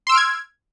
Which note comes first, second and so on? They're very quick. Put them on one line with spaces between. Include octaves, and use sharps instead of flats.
C6 E6 D7 F6 G#6